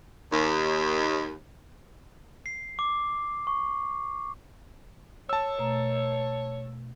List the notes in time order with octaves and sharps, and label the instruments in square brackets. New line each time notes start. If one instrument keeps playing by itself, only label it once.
[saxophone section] D#2
[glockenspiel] C7
D6
C#6
[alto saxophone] C#5 [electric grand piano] A5 E6
[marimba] B2 A3 A#5